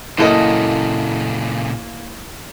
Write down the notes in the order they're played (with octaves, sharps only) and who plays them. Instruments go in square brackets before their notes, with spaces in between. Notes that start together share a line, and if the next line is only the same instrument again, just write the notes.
[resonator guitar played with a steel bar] F#2 A4 D#5 [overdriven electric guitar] A#2 C#3 [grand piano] A#3 [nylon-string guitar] E4